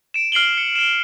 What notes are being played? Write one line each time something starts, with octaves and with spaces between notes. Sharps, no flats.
D7 E7
F6 C7 D7 F#7 G7
C#7
D7 E7